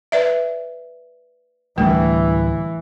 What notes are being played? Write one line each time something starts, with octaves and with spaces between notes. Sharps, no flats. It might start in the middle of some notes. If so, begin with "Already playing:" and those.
B4 D5 E5
D1 E3 G3 A3 D4